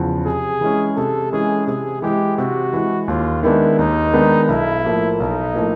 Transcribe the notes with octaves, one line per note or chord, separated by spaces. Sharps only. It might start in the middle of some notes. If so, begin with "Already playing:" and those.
Already playing: E2 C#3 F3
C3 G#4
E3 G#3 C#4
C3 A4
E3 G#3 C#4 G#4
C3 G#4
E3 G#3 G4
C3 F#4
E3 G#3
D#2 F4
D#3 G#3 B3 D4 E4
D#2 D#4
D#3 G#3 B3 D4
B1 E4
A2 F3 A#3
B1 D#4
A2 F3 A#3